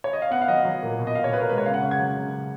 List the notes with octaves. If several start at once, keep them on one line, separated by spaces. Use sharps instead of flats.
C#5
D#5
F5
B3 F#5
F5
F#3 D#5
F#3
A#2
B2
D#5
B2 F5
C#5
B2 B4
A#4
G#3 B4
C#5
C#3 F5
F#5
C#3 C#6
G#6
F#3
C#3